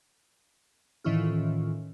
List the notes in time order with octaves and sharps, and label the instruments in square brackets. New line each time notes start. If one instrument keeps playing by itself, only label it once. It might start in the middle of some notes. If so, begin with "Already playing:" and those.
[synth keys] A2 D#3 E3 C#4 E4 F4